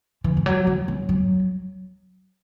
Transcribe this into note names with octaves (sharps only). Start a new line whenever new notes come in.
E3
E3
F#3
E3
F#3
F#3